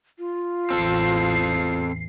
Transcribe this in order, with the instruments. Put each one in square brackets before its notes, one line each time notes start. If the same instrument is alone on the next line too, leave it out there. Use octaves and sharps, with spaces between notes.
[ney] F4
[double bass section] A1 E2 E3 [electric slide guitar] C4 A4 [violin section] C7